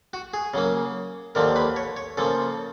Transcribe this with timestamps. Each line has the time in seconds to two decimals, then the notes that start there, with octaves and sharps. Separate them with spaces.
0.13 F#4
0.34 G#4
0.54 C#3 F#3 A#3
1.35 D#2 D3 F3 A#3 A#4
1.56 B4
1.76 C#5
1.97 C#5
2.17 C#3 F3 A#3 A4